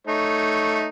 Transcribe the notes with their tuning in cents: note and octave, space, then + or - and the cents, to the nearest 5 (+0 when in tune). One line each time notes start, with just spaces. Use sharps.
A3 +0 D#4 +0 C#5 +0